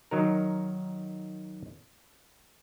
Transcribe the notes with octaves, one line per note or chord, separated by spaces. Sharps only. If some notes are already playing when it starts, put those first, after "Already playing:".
D#3 F#3 D#4 A#4